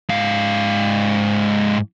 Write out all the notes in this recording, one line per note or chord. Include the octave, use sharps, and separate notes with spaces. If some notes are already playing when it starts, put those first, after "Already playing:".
G#2 F5